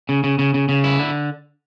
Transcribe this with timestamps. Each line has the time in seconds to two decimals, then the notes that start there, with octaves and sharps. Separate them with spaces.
0.09 C#3
0.24 C#3
0.39 C#3
0.54 C#3
0.69 C#3
0.84 E4
0.99 D3